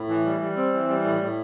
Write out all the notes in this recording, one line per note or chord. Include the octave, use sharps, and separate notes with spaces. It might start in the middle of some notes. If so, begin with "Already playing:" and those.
Already playing: A2
E3
G3
G3
C4
E3
G3
A2
A2